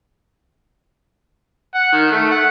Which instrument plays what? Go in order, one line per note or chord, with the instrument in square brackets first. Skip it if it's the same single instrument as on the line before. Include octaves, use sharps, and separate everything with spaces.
[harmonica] F#5
D#3
A3
F#5